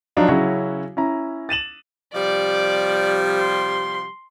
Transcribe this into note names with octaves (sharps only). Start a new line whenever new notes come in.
F3 F#3 D4 D#4 F4
C#3 F#3 C#4 E4 F#4
C#4 E4 A#5
A6 D#7 E7 F#7
C3 F3 G3 D5
C6